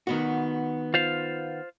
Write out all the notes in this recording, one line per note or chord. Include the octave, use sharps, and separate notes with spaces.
D#3 B3 F#4
F4 C5 F5